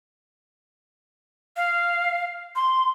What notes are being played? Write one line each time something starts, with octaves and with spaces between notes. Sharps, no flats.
F5
C6